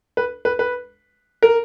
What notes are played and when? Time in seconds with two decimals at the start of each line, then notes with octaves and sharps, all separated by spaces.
0.17 B4
0.45 B4
0.59 B4
1.43 A#4